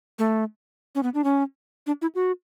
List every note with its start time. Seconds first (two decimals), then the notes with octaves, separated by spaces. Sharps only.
0.19 A3
0.95 C#4
1.03 B3
1.14 D4
1.24 C#4
1.87 D4
2.02 E4
2.15 F#4